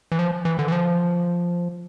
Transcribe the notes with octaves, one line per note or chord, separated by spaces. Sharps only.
E3
F3
E3
D3
E3
F3